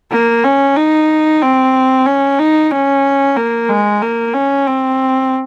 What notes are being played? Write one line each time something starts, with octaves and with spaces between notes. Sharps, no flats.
A#3
C#4
D#4
C4
C#4
D#4
C#4
A#3
G#3
A#3
C#4
C4